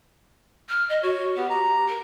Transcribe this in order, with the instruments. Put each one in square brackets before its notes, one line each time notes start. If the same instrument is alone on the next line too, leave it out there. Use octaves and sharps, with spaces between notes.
[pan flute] F6
D#5
[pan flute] F#4 [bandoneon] C#5
[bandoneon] B3 [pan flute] G4
[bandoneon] A#5
[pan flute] A#4